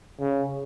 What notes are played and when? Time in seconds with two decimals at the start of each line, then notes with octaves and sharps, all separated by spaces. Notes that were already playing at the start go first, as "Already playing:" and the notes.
0.21 C#3